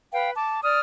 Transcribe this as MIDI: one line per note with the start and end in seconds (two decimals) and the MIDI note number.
0.13 0.31 71
0.13 0.31 77
0.13 0.31 79
0.35 0.60 81
0.35 0.60 86
0.63 0.80 74
0.63 0.80 87
0.63 0.80 89